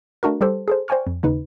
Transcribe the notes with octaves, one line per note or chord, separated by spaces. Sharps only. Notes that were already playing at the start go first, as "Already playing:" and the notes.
A3 D4 F#4 A#4
G3 G4 A4 C5
G#4 A4 C5
C5 D5 G5 G#5 C#6 F6
F2
D#2 C#3 D#4 B4